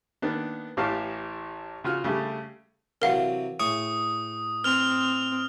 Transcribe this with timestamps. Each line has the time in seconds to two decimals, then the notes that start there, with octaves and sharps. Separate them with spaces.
0.22 D#3 A#3 B3 D4
0.77 A1 A2 E3 G4 F5 A5
1.84 C#3 F4 F#4 F6
2.04 C#3 G3 A3 G4
3.02 C3 E3 F#3 A#4 F5 F#5
3.60 A2 G#4 C#6 D#6
4.64 C4 F6 F7